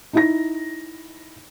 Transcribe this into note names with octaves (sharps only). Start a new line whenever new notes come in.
D#4 E4 A#6